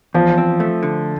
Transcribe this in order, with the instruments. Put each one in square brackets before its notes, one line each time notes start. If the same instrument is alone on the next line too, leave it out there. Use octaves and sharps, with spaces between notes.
[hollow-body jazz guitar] E2 [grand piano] F3
[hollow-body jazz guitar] C4
A3
D3